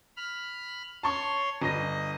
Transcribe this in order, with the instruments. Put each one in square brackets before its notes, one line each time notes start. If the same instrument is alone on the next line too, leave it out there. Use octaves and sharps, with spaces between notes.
[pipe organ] B5 F6
[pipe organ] C#5 C6 [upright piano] A5 C#6
[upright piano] G1 A#6 [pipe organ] D#5